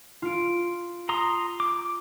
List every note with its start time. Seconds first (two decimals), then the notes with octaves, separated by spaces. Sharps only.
0.22 F4 D7
1.09 A#5 C6 D#6
1.60 D6